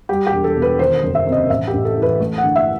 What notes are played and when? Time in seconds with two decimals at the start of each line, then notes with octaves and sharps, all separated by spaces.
0.09 G3 G4
0.27 G4
0.33 E1
0.44 A4
0.56 B2
0.62 B4
0.79 D#3 C5
1.03 F#1
1.15 E5
1.27 C3
1.32 D#5
1.50 A1 E5
1.67 G4
1.73 A1
1.85 A4
1.97 E3
2.02 B4
2.20 A3
2.38 F#5
2.43 G1
2.56 E5